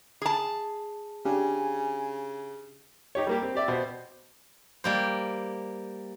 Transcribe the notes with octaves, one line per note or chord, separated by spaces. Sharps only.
G#4 A5
C#3 D4 G4 G#5
D#4 G4 C#5
G3 A#3 G4
C4
G4 D5 E5
B2 C5
G3 A#3 C5